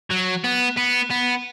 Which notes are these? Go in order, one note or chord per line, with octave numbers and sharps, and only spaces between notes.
F#3
B3
B3
B3